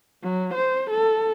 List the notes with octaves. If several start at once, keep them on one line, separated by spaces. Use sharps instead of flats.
F#3
C5
A4